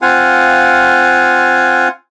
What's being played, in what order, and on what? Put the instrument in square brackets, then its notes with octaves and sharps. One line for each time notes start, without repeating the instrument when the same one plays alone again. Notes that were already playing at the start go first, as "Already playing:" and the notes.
[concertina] C4 F4 F5 F#5 G#5